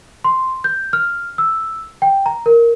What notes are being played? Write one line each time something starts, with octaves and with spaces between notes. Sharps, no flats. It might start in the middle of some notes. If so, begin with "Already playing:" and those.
C6
G6
F6
E6
G5
A#5
A#4